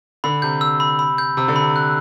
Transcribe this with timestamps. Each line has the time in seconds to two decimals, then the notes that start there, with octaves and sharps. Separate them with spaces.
0.24 D3 B5
0.42 C3 G6
0.61 E6
0.80 B5
0.99 B5
1.18 G6
1.37 C3 E6
1.48 D3
1.56 C3 B5
1.76 F#6